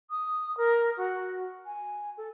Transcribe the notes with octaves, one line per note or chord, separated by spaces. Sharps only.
D#6
A#4
F#4
G#5
A4